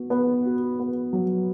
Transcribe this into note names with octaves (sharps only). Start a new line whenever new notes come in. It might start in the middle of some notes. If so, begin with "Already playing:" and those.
Already playing: B3 F#4
B3
F#4
B3
F#3